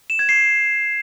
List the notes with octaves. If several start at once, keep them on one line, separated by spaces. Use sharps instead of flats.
E7
G#6
C7